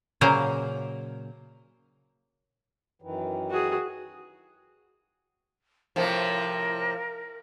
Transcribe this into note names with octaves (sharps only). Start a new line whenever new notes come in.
A#2 C#3 F#3 A#3 A#4 C5
F#2 D#3 E3
F#4 G#4
A2 C3 F3 A#4